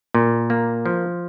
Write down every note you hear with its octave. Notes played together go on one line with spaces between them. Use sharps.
A#2
A#3
F3